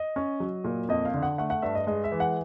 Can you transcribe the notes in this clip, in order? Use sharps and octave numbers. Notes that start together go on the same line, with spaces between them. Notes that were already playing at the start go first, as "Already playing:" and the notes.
Already playing: D#5
C#4
F#3
A#2
F2 D#5
F5
D3
F#5
A3 F#5
F#5
G2 E5
D#5
G#3 D#5
E5
E3
F#5